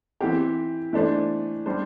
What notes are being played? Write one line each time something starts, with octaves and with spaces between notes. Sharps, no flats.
E3 C4 G4
E3 A3 D4 C5
G3 D4 C5